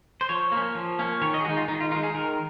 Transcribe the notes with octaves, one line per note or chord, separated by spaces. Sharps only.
C5
F3 C#5
A#3 C#4
F3
A#3 C#4
D#3 C#5
D#5
G#4
G#3 D#4 F#4
F4
D#3 D#4
F4
G#3 D#4 F4
G#4
D#3 A#4